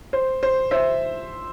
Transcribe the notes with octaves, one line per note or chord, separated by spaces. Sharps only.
C5
C5
C5 E5